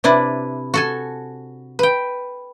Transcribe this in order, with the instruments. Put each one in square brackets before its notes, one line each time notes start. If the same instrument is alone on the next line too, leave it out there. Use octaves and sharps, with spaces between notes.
[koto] C3 D4 E4 B4
F#4 A4 G#5
B4 G5